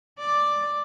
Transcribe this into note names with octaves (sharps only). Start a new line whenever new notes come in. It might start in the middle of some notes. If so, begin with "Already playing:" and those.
D5